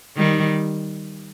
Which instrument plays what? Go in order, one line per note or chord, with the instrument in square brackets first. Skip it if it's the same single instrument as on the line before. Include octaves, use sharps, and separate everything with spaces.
[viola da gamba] D#3 G3